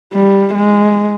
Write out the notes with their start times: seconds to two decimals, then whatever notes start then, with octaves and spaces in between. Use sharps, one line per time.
0.14 G3
0.54 G#3